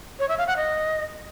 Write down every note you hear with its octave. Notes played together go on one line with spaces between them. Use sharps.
C#5
E5
F5
F#5
D#5